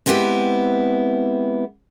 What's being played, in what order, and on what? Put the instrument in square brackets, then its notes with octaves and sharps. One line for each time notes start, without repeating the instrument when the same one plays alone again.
[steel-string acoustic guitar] G#3 B3 C4 E4 G4 B4